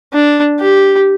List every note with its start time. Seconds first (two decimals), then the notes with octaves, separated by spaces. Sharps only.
0.13 D4
0.60 G4